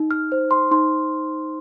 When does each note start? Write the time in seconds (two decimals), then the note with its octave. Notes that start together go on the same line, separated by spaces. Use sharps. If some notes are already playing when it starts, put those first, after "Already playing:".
Already playing: D#4
0.11 F6
0.32 C5
0.51 C6
0.71 D#4 C6